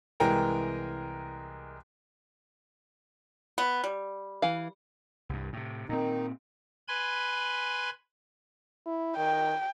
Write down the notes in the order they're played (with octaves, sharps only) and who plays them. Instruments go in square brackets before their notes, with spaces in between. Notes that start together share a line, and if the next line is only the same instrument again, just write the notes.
[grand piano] C2 E3 G#3 A#4 G5 A#5
[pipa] B3
G3
[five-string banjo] E3 F5
[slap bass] C2 G2
A2 C3
[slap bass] A#2 C4 [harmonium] D#3 D#4
[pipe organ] B4 G#5 B5 C6 G#6
[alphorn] E4
[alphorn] D#3 [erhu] G5